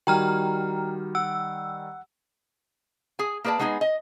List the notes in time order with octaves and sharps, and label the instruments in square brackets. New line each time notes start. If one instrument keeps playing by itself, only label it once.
[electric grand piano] D#3 G3 [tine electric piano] F#4 [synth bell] G5 A#5 F6
[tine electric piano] F#5 [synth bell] E6
[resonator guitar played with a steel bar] G#4 G#5
A#3 G#4 B4 D5 A5
G#3 B3 D#4 G#4 G#5
D#5